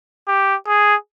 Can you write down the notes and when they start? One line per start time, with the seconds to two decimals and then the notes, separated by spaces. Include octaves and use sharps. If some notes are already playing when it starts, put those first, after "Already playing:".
0.28 G4
0.67 G#4